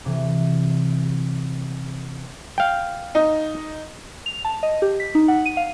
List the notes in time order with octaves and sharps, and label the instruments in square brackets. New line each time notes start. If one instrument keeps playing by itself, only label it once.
[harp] C3 E3
[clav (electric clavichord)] F5 G5
[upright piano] D#4
[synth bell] F7
A5
D#5
G4
B6
D#4
F#5
D#7
F5